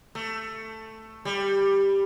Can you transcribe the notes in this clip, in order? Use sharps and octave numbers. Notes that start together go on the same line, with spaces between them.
A3
G3